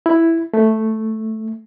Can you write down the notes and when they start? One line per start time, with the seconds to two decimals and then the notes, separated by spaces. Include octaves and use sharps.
0.06 E4
0.54 A3